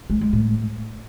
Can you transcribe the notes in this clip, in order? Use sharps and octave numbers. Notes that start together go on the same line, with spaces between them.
G#3
G#3
A2